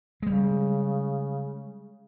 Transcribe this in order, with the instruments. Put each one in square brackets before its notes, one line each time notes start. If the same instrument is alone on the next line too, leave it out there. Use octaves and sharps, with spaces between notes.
[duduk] C#3 [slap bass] G3 G#3